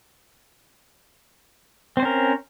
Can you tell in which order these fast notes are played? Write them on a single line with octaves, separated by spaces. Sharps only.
C4 C5 C#4 A#4